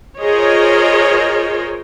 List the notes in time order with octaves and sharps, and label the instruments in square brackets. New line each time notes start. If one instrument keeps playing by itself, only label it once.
[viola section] F4 G#4 A#4 C5 C#5 D#5